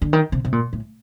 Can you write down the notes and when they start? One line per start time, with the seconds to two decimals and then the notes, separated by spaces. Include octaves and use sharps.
0.02 D3
0.13 D#3
0.32 C3
0.45 C3
0.52 A#2
0.73 A2